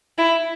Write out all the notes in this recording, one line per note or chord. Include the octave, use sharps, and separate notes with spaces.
E4